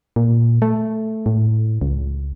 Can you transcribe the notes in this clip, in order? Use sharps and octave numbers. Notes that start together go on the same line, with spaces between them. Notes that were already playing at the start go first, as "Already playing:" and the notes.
A#2
A3
A2
C#2